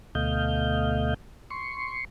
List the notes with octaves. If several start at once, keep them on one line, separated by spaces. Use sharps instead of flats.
D2 B2 A3 D#5 F5 G6
C6 C#6